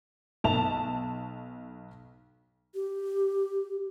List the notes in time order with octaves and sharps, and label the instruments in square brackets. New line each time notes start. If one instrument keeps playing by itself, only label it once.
[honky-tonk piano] B1 A5 F7
[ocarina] G4